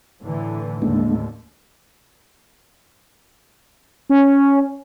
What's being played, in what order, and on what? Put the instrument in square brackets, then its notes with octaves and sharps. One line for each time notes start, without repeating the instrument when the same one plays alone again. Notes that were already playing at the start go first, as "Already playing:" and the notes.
[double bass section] A2 D3 E3
[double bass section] D#2 A2 D3 [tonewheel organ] G#3 A#3 D4
[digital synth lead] C#4